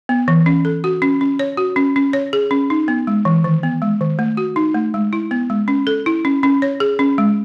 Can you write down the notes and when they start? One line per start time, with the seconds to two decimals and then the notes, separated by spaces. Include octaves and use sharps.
0.09 B3
0.28 E3
0.46 C#4
0.65 A4
0.84 F#4
1.02 C#4
1.21 C#4
1.39 C#5
1.57 F#4
1.76 C#4
1.96 C#4
2.13 C#5
2.33 G#4
2.51 C#4
2.70 D#4
2.88 B3
3.07 G#3
3.25 E3
3.44 D#3
3.63 B3
3.82 G#3
4.01 D#3
4.19 A3
4.37 F#4
4.56 D#4
4.74 A3
4.94 G#3
5.13 E4
5.31 B3
5.50 G#3
5.68 C#4
5.87 A4
6.06 E4
6.25 C#4
6.43 C#4
6.62 C#5
6.80 G#4
6.99 C#4
7.18 G#3